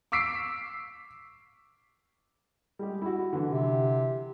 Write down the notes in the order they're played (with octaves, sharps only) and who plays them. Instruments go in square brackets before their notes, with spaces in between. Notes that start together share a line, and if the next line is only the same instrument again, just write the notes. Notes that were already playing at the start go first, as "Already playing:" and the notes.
[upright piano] C#6 D6 E6 B6 C7 D7
[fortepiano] G3 G#3 G4
E4 F#4
D3 E3
[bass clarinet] C3